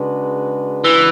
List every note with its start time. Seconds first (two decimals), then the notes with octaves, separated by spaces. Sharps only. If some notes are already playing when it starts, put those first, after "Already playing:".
Already playing: C#3 G#3 D4 F#4 B4
0.84 E3